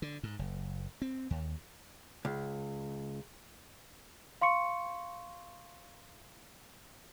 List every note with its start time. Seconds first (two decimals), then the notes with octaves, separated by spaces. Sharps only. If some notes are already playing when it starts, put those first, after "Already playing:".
0.02 D3
0.23 G#2
0.39 F#1
1.02 C4
1.31 D#2
2.25 C#2
4.41 F5 C6 C#6 C#7